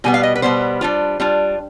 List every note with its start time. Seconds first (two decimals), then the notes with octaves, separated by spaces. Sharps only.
0.04 B2 G3 B3 G#5
0.14 F5
0.23 D#5
0.35 B4
0.42 B2 G3 B3 C5
0.81 G3 D4 F4
1.20 G3 D4 F4